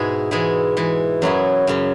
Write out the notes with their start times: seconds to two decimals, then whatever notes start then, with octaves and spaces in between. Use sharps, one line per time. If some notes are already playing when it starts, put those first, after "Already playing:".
Already playing: G#2 B2 G#3 B3 E4 G#4
0.31 G#2 E3 G#3 E4 G#4
0.77 E3 G#3 E4
1.22 F#2 F#3 E4 G#4
1.67 F#2 C#3 F#3